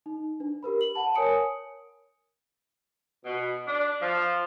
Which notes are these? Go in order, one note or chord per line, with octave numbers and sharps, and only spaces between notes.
D#4
D4 B4
G4 A#4 B4 B5
F#7
F#5 A5 B5
A#4 C#5 G#5 D#6 C#7 D7
B2
D4
F3